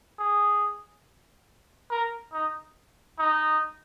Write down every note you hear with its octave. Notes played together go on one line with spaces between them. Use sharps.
G#4
A#4
D#4
D#4